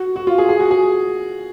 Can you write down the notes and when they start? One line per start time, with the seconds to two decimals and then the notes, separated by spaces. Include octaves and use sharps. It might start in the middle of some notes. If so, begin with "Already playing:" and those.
Already playing: F#4
0.16 F#4
0.27 F4
0.38 G#4
0.49 G#4
0.60 F#4
0.71 G#4